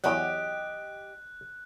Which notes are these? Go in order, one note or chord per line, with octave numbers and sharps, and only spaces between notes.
E2 F#3 G4 D#5 F#6